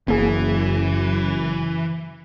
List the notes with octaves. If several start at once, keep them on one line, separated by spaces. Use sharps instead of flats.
F#1 F#2 E3 A#3 G#4